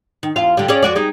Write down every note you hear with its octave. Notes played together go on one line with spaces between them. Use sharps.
D#3
E2 F4 F5
D3 G3
C#4 G#4 D5
F2 F#4 D5
G3 D#4 G#4